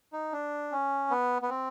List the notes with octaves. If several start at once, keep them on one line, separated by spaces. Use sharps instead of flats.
D#4
D4
C#4
B3
B3
C4